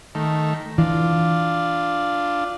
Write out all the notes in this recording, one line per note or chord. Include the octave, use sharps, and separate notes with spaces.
D#3 A3
E3 D4 F4